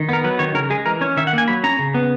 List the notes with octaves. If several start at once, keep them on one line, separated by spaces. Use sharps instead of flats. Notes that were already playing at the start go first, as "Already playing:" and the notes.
Already playing: D#3
B3 A#4
F#3 B4
D#3 C#5
C#3 A#4
G#3 G#4
E3 A#4
C#4 C#5
D#3 E5
F#5
A#3 G#5
F#3 B5
C#4 A#5
C#3
B3